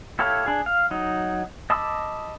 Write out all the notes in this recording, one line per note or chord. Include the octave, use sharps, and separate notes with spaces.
E4 G4 A4 C#5 F5
D4 G#4
F5
F#3 D#4
D#5 A5 B5 D6 E6